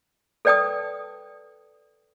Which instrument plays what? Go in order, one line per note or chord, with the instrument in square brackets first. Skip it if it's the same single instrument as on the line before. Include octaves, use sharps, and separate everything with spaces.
[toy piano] A4 B4 D5 G5 A5 D#6